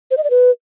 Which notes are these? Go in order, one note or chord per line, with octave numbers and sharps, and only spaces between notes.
C5
D#5
D5
B4